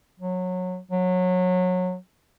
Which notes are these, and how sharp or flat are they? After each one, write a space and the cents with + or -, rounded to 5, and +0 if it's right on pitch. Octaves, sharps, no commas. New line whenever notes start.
F#3 -20
F#3 -20